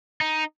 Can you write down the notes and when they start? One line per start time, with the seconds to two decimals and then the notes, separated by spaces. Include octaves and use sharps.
0.21 D#4